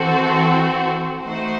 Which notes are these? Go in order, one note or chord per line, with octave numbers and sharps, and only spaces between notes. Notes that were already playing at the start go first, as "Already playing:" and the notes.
Already playing: E3 C4 F#4 A4
A3 D#4 F#4 C5